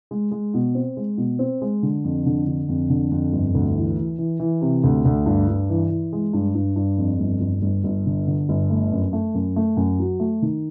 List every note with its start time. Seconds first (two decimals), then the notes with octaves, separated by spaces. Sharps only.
0.11 G#3
0.31 G#3
0.54 B2
0.75 C4
0.97 G#3
1.17 B2
1.39 C4
1.62 G#3
1.82 D3
2.04 F2
2.26 D3
2.47 D3
2.69 F2
2.90 D3
3.11 F2
3.33 G1
3.55 D2
3.76 E3
3.98 E3
4.18 E3
4.40 E3
4.62 C3
4.84 D2
5.05 D2
5.26 G2
5.48 G2
5.70 E3
5.90 E3
6.13 G#3
6.33 G2
6.55 G2
6.76 G2
6.98 F2
7.19 G1
7.40 G1
7.62 G1
7.84 G1
8.06 D3
8.27 D3
8.49 G1
8.70 A3
8.92 F#2
9.13 A3
9.34 F#2
9.56 A3
9.77 F#2
9.99 F#3
10.20 A3
10.42 D#3